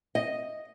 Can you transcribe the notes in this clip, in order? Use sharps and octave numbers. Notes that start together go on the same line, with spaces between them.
D#5